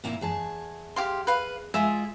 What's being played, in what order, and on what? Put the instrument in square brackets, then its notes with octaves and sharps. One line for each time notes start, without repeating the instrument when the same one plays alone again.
[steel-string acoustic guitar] A#2 A#3 E4
E2 G#4 A5
[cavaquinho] G4 F5 C6
B4 F5
[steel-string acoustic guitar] G#3 F4 G#4 [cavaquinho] E5